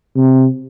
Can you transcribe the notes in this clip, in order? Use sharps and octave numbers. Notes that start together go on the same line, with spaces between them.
C3